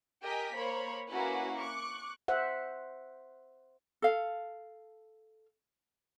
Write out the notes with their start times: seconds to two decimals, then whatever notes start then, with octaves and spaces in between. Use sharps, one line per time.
0.22 G4 A#4 D#5 G5 G#5 B6
0.56 A#3 A#4 C5 C#5 B5
1.09 A#3 C#4 E4 F#4 B4
1.60 C#6 D6 F#6
2.28 C5 E5 F#5
4.02 A4 F5